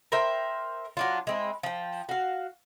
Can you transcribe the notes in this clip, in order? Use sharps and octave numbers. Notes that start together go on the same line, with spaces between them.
A#4 C5 E5 G5
F#3 D4 F4
G#3 C4 E4
F3 G5
F#4 F5